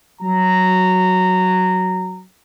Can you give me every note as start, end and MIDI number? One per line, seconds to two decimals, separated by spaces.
0.22 2.24 54
0.22 2.24 82